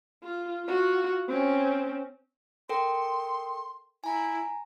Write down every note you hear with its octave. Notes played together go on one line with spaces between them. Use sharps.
F4
F4 F#4
C4 C#4
A4 A#4 G5 C6
E4 G#5 A#5